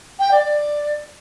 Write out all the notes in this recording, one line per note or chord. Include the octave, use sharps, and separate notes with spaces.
G5
D5
D5